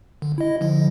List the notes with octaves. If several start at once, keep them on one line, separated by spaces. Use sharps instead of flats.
D3
E4 D#5
D3 F3